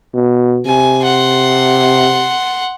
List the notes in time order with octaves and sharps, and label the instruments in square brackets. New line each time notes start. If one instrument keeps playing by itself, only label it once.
[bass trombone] B2
[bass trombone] C3 [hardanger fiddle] G#5
[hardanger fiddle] F#5 C6